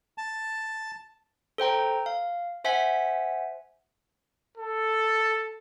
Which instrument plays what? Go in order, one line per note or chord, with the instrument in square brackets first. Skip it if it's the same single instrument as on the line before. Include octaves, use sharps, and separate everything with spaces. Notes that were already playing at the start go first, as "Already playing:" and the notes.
[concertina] A5
[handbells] A4 C5 G5 A#5
F5
C5 E5 F#5 G#5 B6
[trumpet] A4